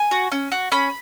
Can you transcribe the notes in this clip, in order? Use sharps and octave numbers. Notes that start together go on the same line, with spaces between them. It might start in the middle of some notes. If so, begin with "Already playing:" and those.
Already playing: G#5
F#4
C#4
F#4
C#4 B5